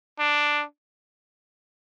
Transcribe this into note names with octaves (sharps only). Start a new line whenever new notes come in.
D4